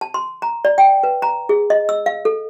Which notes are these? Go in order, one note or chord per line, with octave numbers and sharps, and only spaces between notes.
A5
C6
A#5
D5
G5
B4
A#5
G#4
D#5
E6
F5
A4